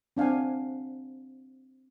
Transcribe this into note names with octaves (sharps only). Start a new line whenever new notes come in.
C4 D4 F5 F#5 G#5